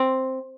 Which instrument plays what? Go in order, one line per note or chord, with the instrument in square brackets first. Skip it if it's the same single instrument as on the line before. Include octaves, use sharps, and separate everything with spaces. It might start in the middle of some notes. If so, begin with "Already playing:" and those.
Already playing: [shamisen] C4